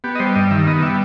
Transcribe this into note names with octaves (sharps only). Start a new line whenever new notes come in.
B3 G4
D#5
G3 C5
G2 D#5
D#3 E5
B3 D#5
G3 E5